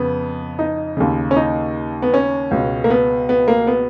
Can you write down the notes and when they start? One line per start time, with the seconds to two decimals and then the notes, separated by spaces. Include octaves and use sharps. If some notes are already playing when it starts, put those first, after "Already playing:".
Already playing: F2 C#3 B3
0.59 D#4
0.97 D#2 C#3
1.31 C#4
1.36 D#4
2.02 B3
2.14 C#4
2.51 C#2 B2
2.84 A#3
2.90 B3
3.29 B3
3.48 A#3
3.67 B3